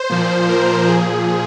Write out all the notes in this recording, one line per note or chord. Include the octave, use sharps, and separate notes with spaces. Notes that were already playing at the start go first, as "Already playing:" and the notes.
Already playing: C5
A#2 F3
A#4
A#2 F3 G#4